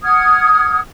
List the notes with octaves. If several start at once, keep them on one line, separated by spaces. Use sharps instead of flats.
F#5 D#6 F6 G#6